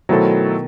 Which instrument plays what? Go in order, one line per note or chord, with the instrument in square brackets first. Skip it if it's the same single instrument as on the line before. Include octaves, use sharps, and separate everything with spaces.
[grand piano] B2 D#3 [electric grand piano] F#3 A3 E4 A4 C5